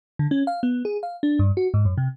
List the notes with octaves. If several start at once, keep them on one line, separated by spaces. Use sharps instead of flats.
D3
C#4
F5
B3
G#4
F5
D4
G2
F#4
G#2
F#2
C3